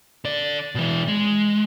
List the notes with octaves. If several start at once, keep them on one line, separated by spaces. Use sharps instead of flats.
D3 D5
B2 E3
G#3